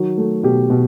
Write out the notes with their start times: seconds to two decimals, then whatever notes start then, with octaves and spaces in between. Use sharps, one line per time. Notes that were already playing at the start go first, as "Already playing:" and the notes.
Already playing: D#3 F#3
0.18 A3
0.43 B2 G4
0.70 B2